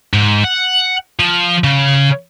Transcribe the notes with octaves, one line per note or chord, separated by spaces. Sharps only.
G#2
F#5
F3
C#3